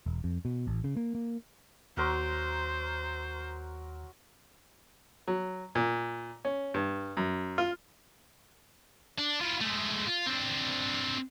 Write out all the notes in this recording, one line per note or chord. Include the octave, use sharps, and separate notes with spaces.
E1
F2
B2
A1
C#3
A#3
A#3
D#2 F#3 A#4 C5 C6
F#3
A#2
C#4
G2
F#2
F4
D4
E4 F4
G#3 A3
F4
C4 D4